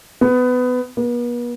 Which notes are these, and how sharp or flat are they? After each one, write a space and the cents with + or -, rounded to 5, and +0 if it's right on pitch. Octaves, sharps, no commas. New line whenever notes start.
B3 +20
B3 -40